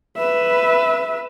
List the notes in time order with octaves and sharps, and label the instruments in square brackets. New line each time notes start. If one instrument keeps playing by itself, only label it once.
[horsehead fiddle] B4 E5